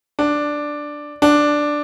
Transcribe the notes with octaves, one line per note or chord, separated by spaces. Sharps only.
D4
D4